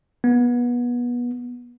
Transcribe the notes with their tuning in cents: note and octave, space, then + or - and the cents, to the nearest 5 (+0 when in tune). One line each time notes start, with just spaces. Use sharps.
B3 -25